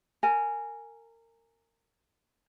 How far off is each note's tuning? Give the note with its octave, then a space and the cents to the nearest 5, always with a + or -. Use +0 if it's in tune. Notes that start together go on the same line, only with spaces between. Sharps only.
A#4 -25 G#5 +0